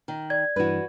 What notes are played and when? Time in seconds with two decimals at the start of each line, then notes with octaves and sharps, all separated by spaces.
0.08 D#3
0.30 D5 G#6
0.56 G2 E3 F#4 B4